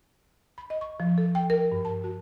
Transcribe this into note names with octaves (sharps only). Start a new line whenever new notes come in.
B5
D#5
C#6
F3
A4
G5
A#4
G2
A5
F#4